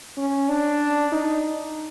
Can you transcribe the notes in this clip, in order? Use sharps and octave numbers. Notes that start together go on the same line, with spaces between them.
C#4
D4
D#4